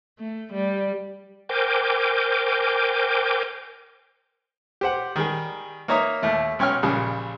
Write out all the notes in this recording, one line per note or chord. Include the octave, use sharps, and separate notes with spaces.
A3
G3
A#4 C5 G5 G#5 D6
G4 C5 F#5
D#3 G3 G#4
A#3 D#4 C#5 E5 A#5 D#6
D#2 A3 E4
B1 C#4 C#5 G5 C#6 F6
A#1 C#3 G3 G#5